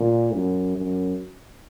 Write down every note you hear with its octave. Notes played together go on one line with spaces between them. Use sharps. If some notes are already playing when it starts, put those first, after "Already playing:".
Already playing: A#2
F#2
F#2